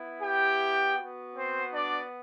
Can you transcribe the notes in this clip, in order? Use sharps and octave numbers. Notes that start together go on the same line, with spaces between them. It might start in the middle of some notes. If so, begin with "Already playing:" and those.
Already playing: B3 E4
G4 G5
B3 F#4
C4 C5
D4 D5